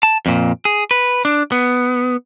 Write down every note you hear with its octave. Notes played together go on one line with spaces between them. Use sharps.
A5
F2 A#2
G#4
B4
D4
B3